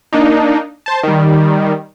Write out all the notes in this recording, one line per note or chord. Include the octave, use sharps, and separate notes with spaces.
A#3 D4 D#4
C5 A5
D#3 G3